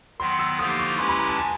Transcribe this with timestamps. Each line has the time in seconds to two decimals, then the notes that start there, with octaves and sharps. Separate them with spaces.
0.20 D#3 F#3 B3 C6
0.39 E6
0.59 D3 F3 A#3 D#4 G4 D#6
0.79 C#6
0.99 G#3 C#4 E4 G4 B4 C6
1.09 B5
1.18 A#5
1.29 A5
1.39 G#5